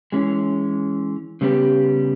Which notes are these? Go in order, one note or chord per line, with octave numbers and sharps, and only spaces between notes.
E3 G#3 C#4
C#3 G3 B3 G4